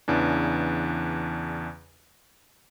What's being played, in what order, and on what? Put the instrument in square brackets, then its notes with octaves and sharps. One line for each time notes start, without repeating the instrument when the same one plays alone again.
[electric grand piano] E2 C#3 E3 D4